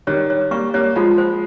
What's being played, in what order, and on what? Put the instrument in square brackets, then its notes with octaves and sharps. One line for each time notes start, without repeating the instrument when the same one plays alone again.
[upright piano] D#3 G3 [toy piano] C#5
[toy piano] C#5
[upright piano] G3 A#3 [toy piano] C#6
[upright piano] G3 A#3 [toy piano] C#5
[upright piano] F3 G#3 [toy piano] F4
[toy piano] C5